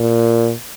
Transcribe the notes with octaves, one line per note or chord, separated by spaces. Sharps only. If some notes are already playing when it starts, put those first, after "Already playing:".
Already playing: A#2